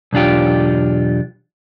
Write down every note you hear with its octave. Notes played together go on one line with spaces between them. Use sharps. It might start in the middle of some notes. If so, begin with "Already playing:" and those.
B1 E2 D4 F4 G4